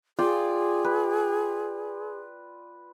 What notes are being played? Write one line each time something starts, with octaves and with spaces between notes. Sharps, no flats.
F4 G#4 D5 G5
B4